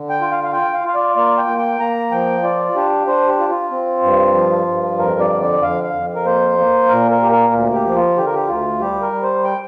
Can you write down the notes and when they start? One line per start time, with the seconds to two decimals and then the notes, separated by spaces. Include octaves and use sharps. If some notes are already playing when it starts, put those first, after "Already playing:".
Already playing: D3
0.10 G5
0.21 F4
0.31 F5
0.44 F5
0.52 F4 G5
0.73 F5
0.84 F4 F5
0.95 D5
1.16 A#3 D5
1.38 G5
1.48 A#3
1.58 G5
1.79 A#3 A#5
2.11 F3 G5
2.43 F4 D5
2.75 D4 G4
3.07 D4 C5
3.28 G4
3.39 F4
3.50 F4
3.71 C4
4.03 G2
4.34 F3
4.67 G2
4.98 F2 A#4
5.20 D5
5.30 D3
5.41 D5
5.62 F2 F5
5.84 F5
5.94 F2
6.15 A#4
6.25 A#3 C5
6.58 A#3
6.89 A#2 A#4
7.11 A#4
7.21 A#3 G4
7.31 A#4
7.53 D2
7.74 G4
7.86 F3
7.95 F4
8.17 D3 G4
8.26 A#4
8.35 G4
8.48 D2 F4
8.80 G3 G4
9.02 A#4
9.12 G3
9.23 C5
9.44 G5